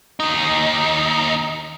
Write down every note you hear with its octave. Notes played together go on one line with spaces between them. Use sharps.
D#2 D#4